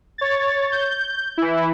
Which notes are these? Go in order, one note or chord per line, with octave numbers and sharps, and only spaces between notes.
C#5 A6
G6
E3 E4